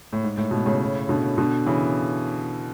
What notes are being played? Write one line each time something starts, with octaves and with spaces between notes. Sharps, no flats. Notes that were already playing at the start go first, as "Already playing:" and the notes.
A2
G#2
A2
G#2 B2
A2 C#3
B2 D3
B2 D3
C#3 E3